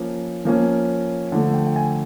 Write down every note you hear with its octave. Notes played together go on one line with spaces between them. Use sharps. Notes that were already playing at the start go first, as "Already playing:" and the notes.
Already playing: F3 A#3 C#4
F3 A#3 C#4
D3 F3 A3
G5
G5
G#5